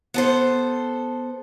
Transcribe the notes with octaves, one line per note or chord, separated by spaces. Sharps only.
B3 A4 C5